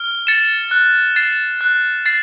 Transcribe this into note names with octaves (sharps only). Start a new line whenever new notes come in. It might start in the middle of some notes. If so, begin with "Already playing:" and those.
Already playing: F6
A6 C#7 E7
F#6
A6 C7 E7
F#6
A6 C7